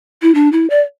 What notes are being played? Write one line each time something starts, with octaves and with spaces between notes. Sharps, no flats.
E4
D4
E4
D5